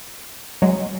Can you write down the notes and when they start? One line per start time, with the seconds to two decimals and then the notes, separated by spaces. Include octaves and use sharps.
0.62 F#3 G#3